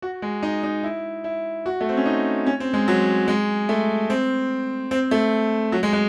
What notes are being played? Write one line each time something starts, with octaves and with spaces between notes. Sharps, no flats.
F#4
G#3
D#4
D#4
E4
E4
F#4
A3
C4
C#4
D#4
C#4
C4
G#3
F#3
G#3
A3
C4
C4
A3
F#3
G#3
G#3